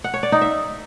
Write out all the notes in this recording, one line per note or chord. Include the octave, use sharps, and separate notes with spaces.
F#5
C#5
D5
D#4
E5